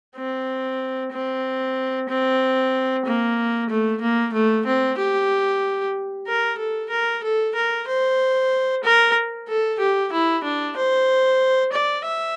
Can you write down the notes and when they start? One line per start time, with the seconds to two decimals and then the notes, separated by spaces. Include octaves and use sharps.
0.16 C4
1.12 C4
2.09 C4
3.05 A#3
3.69 A3
4.01 A#3
4.33 A3
4.66 C4
4.98 G4
6.27 A#4
6.58 A4
6.90 A#4
7.23 A4
7.55 A#4
7.88 C5
8.84 A#4
9.48 A4
9.80 G4
10.12 E4
10.44 D4
10.77 C5
11.72 D5
12.05 E5